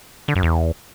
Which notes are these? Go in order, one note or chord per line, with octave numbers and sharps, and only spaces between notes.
D3
F#2
E2